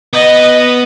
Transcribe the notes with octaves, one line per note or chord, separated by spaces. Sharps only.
B3 D#5